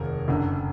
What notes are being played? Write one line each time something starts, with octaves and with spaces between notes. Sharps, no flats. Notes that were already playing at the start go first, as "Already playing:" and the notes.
Already playing: F1 D#2 D#3 G#4 A#4
F#1 F#2 D3